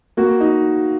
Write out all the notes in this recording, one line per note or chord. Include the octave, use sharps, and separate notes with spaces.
A#3 F#4
D#4